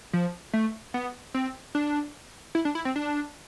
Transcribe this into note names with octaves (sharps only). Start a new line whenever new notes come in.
F3
A3
B3
C4
D4
E4
D4
E4
C4
D4